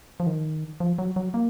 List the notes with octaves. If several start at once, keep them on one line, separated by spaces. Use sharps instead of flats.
F3
D#3
F3
F#3
F#3
A#3